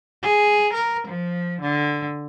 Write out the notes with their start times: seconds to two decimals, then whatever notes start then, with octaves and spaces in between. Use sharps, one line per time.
0.23 G#4
0.73 A#4
1.07 F3
1.61 D3